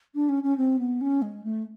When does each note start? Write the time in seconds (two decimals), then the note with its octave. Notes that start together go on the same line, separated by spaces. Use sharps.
0.14 D4
0.28 C#4
0.43 C#4
0.57 C4
0.78 B3
1.01 C#4
1.22 G#3
1.44 A3